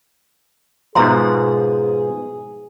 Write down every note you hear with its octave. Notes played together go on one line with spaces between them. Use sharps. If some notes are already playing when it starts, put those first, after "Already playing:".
G#2 B2 F3 G#4 E5 A#5 C6